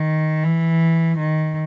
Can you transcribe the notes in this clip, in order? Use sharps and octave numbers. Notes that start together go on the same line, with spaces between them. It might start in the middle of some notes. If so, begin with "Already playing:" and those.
Already playing: D#3
E3
D#3